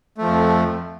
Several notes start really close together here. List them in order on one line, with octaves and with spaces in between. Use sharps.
A3 F3 F2